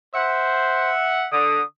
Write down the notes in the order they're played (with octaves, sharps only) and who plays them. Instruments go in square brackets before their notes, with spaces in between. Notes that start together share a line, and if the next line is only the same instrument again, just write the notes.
[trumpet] C5 [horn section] E5 F#5
[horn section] D3 [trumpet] D#6